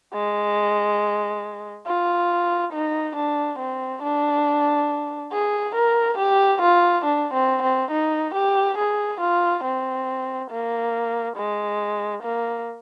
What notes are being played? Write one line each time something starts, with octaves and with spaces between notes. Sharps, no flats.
G#3
F4
D#4
D4
C4
D4
G#4
A#4
G4
F4
D4
C4
C4
D#4
G4
G#4
F4
C4
A#3
G#3
A#3